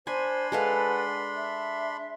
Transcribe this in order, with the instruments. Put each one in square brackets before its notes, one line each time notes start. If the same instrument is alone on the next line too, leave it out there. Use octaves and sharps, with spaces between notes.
[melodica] D4 B5 C6 [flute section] C5 [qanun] G#5
[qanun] G#3 A4 F5 [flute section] B4 F#5
[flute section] E5